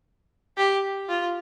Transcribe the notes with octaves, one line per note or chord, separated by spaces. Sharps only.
G4
F4